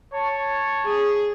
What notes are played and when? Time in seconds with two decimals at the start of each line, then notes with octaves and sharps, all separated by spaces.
0.13 C#5 A5 C#6
0.86 G#4